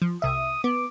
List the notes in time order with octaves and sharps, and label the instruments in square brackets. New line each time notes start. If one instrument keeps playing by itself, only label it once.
[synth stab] F3
[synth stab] C2 E5 [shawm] D#6
[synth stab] B3 [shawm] D6